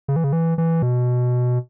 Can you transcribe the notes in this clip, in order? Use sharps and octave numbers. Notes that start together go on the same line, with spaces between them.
C#3
E3
C#3
E3
E3
B2